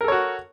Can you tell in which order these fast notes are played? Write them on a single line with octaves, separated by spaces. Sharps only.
A#4 A4 C#5 F#4